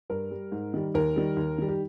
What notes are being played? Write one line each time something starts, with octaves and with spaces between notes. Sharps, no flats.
G2 A#4
G3
G#2
D#3 G3
D#2 A#4
D#3 G3
D#2
D#3 G3
G4